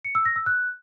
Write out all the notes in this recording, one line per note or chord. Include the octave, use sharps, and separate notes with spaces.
C#7
E6
A#6
E6
F#6